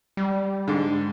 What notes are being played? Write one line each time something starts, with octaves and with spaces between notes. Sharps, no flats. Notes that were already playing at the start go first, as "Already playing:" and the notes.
G3
G#2 D3